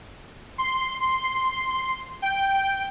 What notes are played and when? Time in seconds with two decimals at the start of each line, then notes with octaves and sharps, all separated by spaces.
0.58 C6
2.22 G5